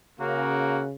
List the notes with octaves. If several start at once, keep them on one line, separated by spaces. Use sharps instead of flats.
C#3 A#3 F#4 A#4